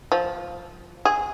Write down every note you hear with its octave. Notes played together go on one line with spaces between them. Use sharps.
F3
G#4